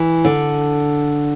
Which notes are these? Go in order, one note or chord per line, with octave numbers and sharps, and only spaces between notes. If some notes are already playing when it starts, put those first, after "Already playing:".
Already playing: E3
D3